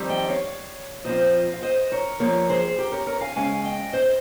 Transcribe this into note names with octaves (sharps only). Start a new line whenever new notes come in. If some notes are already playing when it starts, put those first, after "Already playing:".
Already playing: F2 D#3 G3 C4
D#5 G5
C#5 F5
A#2 F3 C4 F4 C5 D#5
F5
C5 D#5
A#4 C#5
G2 F3 A#3 A#4 C#5
G#4 C5
G4 A#4
A#4 C#5
A#4 C#5
F5 G#5
C#3 G#3 C#4 F5 G#5
D#5 G5
C5 D#5